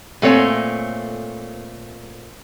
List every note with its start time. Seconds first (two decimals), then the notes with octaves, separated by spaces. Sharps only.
0.22 A#2 A3 C4 C#5 G#5